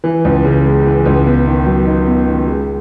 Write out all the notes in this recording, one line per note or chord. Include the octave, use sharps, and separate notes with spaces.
E3
C#2
C#3
G#3
E3
C#2
B3
D#3
F#3
D#4
B3
D#3
G#3